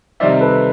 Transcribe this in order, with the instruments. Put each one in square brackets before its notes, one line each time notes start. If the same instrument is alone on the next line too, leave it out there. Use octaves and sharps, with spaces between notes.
[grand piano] C3 D#3 G3 C4 D#4 [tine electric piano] D5 E5
[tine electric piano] A4 B4